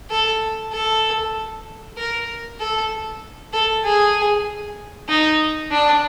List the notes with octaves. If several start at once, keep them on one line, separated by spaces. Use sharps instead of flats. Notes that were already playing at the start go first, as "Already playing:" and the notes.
A4
A4
A#4
A4
A4
G#4
D#4
D4